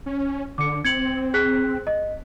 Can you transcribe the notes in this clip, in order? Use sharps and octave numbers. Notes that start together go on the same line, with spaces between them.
C#4
D3 D6 C#7
C4 G#6 C#7 F#7
G#4 F#6 B6
D#5